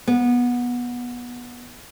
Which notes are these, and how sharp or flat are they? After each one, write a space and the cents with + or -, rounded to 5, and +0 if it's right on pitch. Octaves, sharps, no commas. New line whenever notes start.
B3 -20